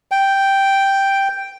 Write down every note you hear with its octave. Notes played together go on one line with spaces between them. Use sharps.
G5